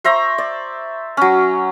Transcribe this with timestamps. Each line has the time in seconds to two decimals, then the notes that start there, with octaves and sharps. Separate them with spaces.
0.04 C5 E5 A#5 C#6
0.38 D5
1.17 F#3 C#4